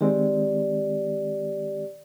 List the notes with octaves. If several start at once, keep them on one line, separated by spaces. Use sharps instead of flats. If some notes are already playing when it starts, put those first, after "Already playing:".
D#3 G#3 C4 G4 D5